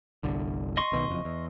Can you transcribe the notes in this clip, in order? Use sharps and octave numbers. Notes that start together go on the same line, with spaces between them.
G1 C2 D3
D#5 C6 C#6
B1 B2 D#3
F#1 F2
E2